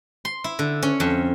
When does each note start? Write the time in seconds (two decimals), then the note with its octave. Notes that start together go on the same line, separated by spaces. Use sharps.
0.25 C6
0.44 E4
0.59 D3
0.82 C#4
1.00 F2